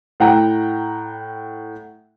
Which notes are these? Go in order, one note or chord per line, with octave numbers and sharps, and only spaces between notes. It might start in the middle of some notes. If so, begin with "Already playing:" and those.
A2 F#5 G5 A#5